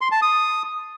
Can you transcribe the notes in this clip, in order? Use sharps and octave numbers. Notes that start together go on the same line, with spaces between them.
C6
A5
D#6